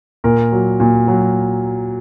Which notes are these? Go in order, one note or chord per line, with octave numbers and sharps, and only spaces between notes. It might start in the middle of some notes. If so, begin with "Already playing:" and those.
A#2 A#4
F#3
A#2
F#3